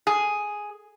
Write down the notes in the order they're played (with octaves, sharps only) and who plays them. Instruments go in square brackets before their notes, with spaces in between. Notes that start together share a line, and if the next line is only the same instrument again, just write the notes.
[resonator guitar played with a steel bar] G#4